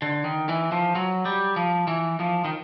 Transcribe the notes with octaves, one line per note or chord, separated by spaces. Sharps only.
D3
D#3
E3
F3
F#3
G3
F3
E3
F3
D#3